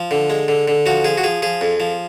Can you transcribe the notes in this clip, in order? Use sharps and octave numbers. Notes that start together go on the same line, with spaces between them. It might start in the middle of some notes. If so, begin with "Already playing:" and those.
Already playing: F3
D3
G#3
D3
D3
F3 F#4
F3 G#4
F#4
F3 G#4
F3 G#4
F2
F3